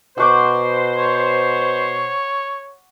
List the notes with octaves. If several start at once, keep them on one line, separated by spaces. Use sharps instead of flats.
B2 C5 F#5 C#6 D6
C#5